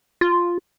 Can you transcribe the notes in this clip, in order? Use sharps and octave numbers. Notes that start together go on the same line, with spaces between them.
F4